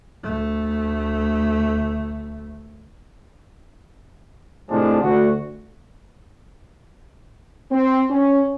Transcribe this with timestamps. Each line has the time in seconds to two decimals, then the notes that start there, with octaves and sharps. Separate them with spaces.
0.23 D2 A3
4.70 A2 C3 F3 G#3 D4
5.02 D2 F#4
7.72 C4
8.10 C#4